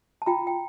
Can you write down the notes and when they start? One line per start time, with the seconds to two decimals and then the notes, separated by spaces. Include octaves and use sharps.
0.22 A5
0.26 F4 G5 A#5
0.47 G5